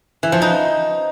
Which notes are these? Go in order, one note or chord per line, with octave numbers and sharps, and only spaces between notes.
E3
F3
D#4